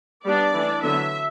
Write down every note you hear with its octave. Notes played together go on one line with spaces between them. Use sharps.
G3 B3 D4 D5
E3 A3 D4
D3 F#3 B3 E5